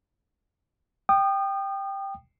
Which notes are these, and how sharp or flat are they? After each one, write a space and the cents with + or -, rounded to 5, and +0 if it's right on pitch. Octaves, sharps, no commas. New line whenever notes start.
G5 +0 D#6 -35